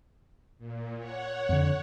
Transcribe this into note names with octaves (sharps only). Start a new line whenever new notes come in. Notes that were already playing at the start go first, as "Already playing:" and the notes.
A#2
C#5 F#5
F2 D3